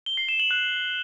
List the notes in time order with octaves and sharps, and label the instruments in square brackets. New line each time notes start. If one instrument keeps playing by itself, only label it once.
[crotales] G7
C7
E7
F#7
F#6